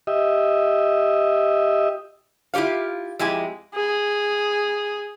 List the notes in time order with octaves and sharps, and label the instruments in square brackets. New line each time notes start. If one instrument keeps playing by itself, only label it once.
[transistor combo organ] G4 D#5 E5
[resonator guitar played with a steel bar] E4 F4 G4 C#5 F5
F2 G#3 E4 G4 G#5
[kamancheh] G#4